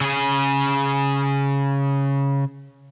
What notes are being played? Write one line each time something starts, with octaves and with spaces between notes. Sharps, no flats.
C#3 G#4